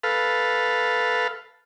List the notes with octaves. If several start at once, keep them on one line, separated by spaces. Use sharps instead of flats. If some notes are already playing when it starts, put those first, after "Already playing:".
A4 B4 F5